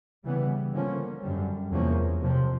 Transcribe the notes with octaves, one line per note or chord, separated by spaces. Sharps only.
C#3 E3 G3 B3
D3 F3 A#3 C#4
F#2 D3 G3
E2 C3 F3 A#3 C#4
F2 C3 F3